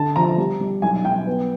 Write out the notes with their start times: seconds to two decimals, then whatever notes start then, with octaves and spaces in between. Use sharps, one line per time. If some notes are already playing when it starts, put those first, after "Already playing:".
Already playing: D3 A5
0.16 F3 A#5
0.38 G3
0.60 G3
0.82 B1 G#5
1.05 B1 G5
1.27 B3